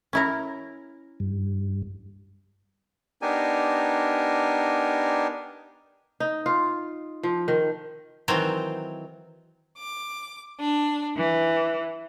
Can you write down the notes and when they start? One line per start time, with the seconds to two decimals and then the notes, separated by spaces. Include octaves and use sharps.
0.13 C#4 E4 A#4
1.20 G2
3.22 B3 D4 D#4 G4 A#4 G#5
6.20 D#4
6.46 F4
7.23 F3
7.48 D#3
8.28 D#3 E3 F#3 C4
9.78 D6
10.59 D4
11.17 E3